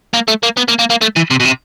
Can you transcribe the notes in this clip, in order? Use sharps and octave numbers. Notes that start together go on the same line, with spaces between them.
A#3
A3
A#3
B3
A#3
A#3
A#3
A3
E3
C3
B2
C3